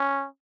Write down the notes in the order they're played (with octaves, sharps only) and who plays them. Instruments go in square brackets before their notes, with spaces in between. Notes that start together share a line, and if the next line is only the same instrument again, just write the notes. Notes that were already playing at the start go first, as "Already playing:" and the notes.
Already playing: [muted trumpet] C#4